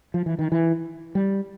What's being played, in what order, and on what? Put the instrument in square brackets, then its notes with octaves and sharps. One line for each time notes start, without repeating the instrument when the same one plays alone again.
[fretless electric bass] F3
E3
D#3
E3
G3